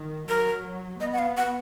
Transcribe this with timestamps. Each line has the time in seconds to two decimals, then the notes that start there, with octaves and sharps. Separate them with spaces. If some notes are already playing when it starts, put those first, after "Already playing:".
Already playing: D#3
0.29 F#3 A#4
1.00 B3 D#5
1.13 F#5
1.19 F5
1.37 F#5